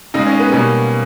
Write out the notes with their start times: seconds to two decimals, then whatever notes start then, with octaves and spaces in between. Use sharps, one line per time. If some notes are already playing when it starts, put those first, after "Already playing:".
0.14 C#3 G#3 D#4
0.27 C#4
0.40 B3
0.52 B2 G3 A#3 C#4